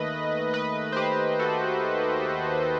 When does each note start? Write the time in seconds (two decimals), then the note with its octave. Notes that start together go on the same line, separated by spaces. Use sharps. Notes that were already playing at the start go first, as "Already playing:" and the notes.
Already playing: D#2 D#3 A3 B4 D#5
0.54 B4 D#5
0.92 C5
0.96 G4 B4
1.39 F#4 A4
2.26 G4
2.47 F#4
2.62 A4